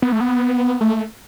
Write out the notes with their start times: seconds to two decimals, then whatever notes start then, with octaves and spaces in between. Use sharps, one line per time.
0.02 B3
0.12 A3
0.21 B3
0.81 A3